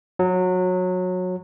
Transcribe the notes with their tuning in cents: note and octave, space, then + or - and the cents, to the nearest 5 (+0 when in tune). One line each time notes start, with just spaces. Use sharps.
F#3 -20